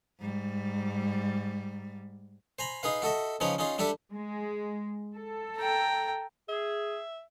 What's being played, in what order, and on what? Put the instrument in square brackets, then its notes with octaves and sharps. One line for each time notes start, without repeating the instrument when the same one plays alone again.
[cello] G#2 G3
[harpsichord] C5 G#5 A#5 B5
D#4 G#4 B4 F5
F#4 A4 D#5 E5
C#3 F3 C#4 D#4 B4 C#5
C#4 D#4 F4 G#4
G3 D4 G4 A4 E5
[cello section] G#3
A4
[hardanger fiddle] G5 A#5
[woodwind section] G#4 [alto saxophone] E5